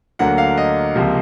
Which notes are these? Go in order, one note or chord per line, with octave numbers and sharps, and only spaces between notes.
D2 D3 F#3 A#3 F#5
F5
D#5
C#2 C3 F3 A#3